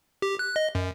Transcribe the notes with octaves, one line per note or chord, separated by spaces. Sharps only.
G4
F#6
D#5
F#2